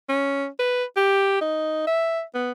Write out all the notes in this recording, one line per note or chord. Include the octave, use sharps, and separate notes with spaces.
C#4
B4
G4
D#4
E5
B3